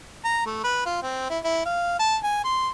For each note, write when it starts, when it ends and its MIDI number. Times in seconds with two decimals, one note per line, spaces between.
0.24 0.44 82
0.46 0.61 57
0.64 0.83 71
0.86 0.98 65
1.02 1.26 60
1.30 1.39 64
1.44 1.64 64
1.66 1.99 77
1.99 2.17 81
2.23 2.42 80
2.44 2.70 84